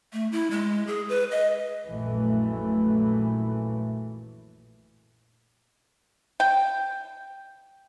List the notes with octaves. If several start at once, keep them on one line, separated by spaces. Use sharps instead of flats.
A3
E4
G#3
G#4
B4
D#5
A#1 F#2 A#2 E3 A3
G5